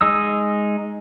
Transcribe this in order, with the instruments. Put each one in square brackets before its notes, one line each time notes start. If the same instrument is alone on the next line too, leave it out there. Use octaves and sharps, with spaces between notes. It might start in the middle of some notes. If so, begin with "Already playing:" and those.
[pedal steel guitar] G#3 D#4 D#6 E6